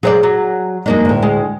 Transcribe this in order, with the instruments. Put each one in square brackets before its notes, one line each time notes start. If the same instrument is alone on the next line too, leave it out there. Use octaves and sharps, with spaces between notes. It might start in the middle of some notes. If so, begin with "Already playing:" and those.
[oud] F#3 C5 D5 [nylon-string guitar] G#4
[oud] F#3
[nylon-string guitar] F#2 D#4 [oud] G#3 A#3 D4
[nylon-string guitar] D2 A2
[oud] G#3